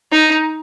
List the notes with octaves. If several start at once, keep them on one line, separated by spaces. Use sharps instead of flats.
D#4